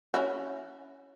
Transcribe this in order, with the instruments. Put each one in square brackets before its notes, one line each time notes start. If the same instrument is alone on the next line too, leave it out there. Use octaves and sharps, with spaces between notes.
[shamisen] C#4 E4 F#4